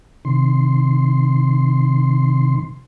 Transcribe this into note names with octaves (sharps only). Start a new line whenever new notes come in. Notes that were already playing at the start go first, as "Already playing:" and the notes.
C3 D#3 C6